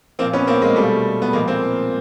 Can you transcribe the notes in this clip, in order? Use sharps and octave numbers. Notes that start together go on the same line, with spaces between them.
A#2 F3 A#3 C4
B3 C#4
A#3 C4
G#3 A#3
B2 G3 A3
B3
A#2 F3 G#3 A#3
A#3 C4